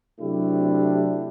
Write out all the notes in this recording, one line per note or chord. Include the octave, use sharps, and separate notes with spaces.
C3 F#3 A3 D4 E4 G4